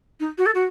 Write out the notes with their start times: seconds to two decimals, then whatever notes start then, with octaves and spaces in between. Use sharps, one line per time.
0.20 D#4
0.38 F#4
0.46 A4
0.54 F#4